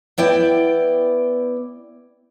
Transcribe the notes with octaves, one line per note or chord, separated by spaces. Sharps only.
B3 E4 D5 G5